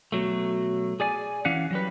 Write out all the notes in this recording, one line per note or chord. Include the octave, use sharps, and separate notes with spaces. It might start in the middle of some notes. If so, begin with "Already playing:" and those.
B2 F#3 A3
G#4 D5 G#5
E3 C#4 F5 F#5
F#3 G3 B4